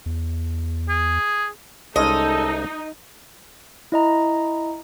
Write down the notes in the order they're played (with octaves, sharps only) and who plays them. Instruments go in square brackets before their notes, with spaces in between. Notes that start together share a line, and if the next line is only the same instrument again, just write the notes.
[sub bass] E2
[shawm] G#4
[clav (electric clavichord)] C2 G#3 C#4 [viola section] D#4 [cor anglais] A4 [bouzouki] D#5
[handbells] E4 D#5 A#5